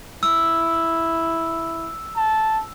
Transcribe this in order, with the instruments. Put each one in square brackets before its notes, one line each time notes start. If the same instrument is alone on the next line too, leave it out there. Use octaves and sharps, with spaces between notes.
[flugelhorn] E4 [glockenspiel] E6
[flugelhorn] A5